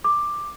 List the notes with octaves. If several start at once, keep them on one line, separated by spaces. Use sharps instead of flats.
D6